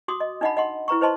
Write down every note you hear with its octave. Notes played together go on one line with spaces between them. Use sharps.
F#4 C6 D6 D#6
D#5
D4 D#4 D#5 F5 F#5 B5
D#5 F#5 C6
E4 B4 A#5 C#6
B4 C5 D#5 A5 C6